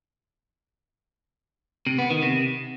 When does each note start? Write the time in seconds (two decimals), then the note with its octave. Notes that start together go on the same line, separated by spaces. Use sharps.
1.87 C3
1.99 B3
2.10 D#3
2.22 C3